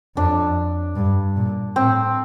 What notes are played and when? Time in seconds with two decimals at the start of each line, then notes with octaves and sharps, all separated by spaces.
0.17 F2 D4
0.96 G2
1.36 A#2
1.76 A2 C4